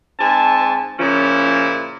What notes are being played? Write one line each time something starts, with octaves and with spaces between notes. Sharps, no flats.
G#2 C4 G#5 A5
A#2 C#3 F3 C#4 E4